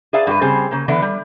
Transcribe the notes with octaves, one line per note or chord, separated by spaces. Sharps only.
G#4 B4 D5 E5 F5 A5
G2 F#4 B4
C#3 G3 C4 G#4 C5
C#3 A#3
D3 E3 B3 D4 B4
G3